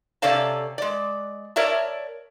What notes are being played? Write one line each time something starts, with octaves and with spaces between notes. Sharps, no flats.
C3 C#4 A4 D5 F5 A5
G#3 D5
A#4 C#5 D5 E5 A5